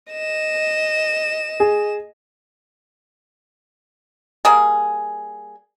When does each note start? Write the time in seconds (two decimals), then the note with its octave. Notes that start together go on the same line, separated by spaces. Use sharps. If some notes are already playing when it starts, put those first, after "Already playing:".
0.11 D#5 E7
1.60 G#4
4.45 G3 A#3 G#4